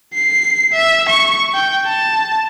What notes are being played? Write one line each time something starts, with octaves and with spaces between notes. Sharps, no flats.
C7
E5
C#6
G5
A5